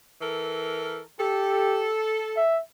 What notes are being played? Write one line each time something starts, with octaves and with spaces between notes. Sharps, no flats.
E3 A4 A#4
G4 A4
E5